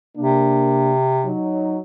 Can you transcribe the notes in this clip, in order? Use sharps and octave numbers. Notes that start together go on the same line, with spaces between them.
C3 A#3 D4
F#3 D#4